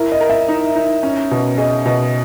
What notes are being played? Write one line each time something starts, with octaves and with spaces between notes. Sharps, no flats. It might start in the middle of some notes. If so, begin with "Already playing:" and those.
Already playing: E4 A#4
D#5
A#4
E5
D#4
D#4
C#4
B2
G#4 D#5
B2